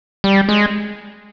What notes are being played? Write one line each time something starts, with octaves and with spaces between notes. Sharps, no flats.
G3
G#3